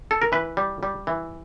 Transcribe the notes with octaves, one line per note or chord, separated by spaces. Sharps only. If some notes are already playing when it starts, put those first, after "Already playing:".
A4
A#4
E3 B4
G3
G3
E3